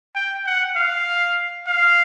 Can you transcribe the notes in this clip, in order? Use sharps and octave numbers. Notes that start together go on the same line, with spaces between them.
G5
F#5
F5
F5